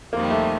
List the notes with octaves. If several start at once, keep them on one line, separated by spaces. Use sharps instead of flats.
F2 C3 D#3 G3 A#3
A3